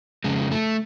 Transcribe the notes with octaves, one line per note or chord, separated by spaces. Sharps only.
F2 C#3 G#3
A3